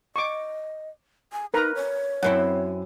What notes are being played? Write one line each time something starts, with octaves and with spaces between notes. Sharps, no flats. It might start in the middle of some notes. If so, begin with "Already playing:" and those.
D#5 C#6 D6
G#5
D#4 A#4 B4 A#5
C#5
F#2 C4 E4 F#5